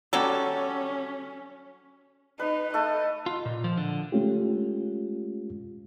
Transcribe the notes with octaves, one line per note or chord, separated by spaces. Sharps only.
F#3 G3 C#4 A4
D#4 B4
A3 A4 D#5
F4
A#2
F3
D3
G#3 A3 C#4 F4 G4